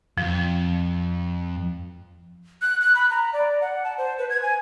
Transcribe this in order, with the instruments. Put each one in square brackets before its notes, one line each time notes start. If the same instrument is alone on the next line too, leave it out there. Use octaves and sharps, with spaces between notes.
[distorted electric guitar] F2 [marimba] F3
[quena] F#6
F#6
B5
A#5
D5
F#5
A5
C5
B4
G#6
G#5